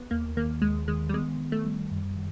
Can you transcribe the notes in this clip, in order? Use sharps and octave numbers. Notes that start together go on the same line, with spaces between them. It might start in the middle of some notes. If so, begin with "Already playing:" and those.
Already playing: B3
D#2 A#3
D#3 A#3
D#2 G#3
D#3 G#3
G3
G#3 B3
D#3
A3
G3
F#2
D#3